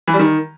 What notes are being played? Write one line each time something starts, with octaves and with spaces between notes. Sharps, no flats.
E3
G3
D#3